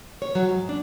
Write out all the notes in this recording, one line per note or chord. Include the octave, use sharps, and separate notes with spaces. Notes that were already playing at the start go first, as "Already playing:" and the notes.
C#5
F#3
G#2
D4